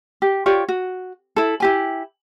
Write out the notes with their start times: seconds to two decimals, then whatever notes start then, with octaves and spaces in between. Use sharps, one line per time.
0.22 G4
0.46 F4 G4 C#5 D5
0.68 F#4
1.36 E4 A4
1.60 E4 G4 G#5